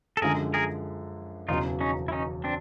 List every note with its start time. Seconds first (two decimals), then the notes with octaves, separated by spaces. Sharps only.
0.17 A4
0.21 F#2 D3 F3 G#3 G#4 A#4
0.54 G#4 A#4
1.49 E1 E2 C#3 F#3 D#4 F4
1.81 C#4 D#4
2.08 E4
2.12 C#4 D#4
2.44 C4 D4